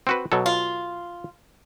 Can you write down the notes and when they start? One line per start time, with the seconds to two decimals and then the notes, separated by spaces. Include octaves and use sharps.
0.07 C4 F#4 B4
0.32 B2 F#3 A4
0.46 F4